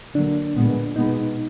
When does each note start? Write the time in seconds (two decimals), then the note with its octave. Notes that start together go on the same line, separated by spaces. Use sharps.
0.15 D3 F#3 A#3 D4
0.55 A#2 G#3 B3
0.96 B2 G#3 B3 D#4